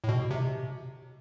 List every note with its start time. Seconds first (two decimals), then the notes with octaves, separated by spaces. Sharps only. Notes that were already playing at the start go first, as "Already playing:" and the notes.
0.04 A2
0.09 B2
0.31 C3